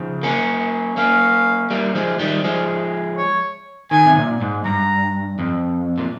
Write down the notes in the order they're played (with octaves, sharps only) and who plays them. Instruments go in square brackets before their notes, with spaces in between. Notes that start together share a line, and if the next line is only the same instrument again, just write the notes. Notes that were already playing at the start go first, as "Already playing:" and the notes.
Already playing: [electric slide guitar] C#3 F3
A#3 C#4
[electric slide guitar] A#3 C#4 [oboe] F5
[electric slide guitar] G3 A#3
F3 G#3
D#3 G3
F3 G#3
[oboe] C#5
[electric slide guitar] D#3 [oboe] G#5
[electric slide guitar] C3
A#2
G#2
[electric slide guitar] G2 [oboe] A#5
[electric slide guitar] F2
A#2